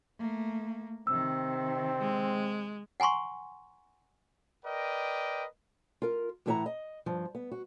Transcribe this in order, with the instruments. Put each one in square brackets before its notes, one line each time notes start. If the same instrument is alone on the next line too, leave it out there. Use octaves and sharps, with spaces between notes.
[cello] A3 A#3
[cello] C3 D#3 [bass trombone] C4 [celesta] E6
[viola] G#3
[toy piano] F#5 G#5 A#5 C6 C#6
[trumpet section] A#4 B4 D5 D#5 G5
[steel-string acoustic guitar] F4 A#4
A2 E3 E4 B4 F#5 A#5
D#5
G2 F3
B3
F#4